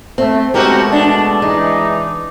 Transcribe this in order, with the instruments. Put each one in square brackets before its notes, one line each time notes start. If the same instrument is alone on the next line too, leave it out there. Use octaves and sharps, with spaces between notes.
[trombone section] A3 [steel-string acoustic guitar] C4
[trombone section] B2 G#3 A3 [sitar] C4 F#4 G4 [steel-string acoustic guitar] C#4 A#4
[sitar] D4
[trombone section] E3 D#4 [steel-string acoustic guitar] G#3